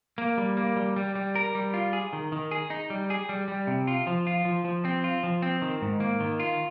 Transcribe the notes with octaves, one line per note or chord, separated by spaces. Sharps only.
A#3
G3
A#3
G3
G3
G3
A#4
G3
F4
G#4
D#3
D#3
G#4
D#4
G3
G#4
G3
G3
C3
F4
F3
F4
F3
F3
C4
F4
F3
C4
D#3
G#2
A#3
D#3
F4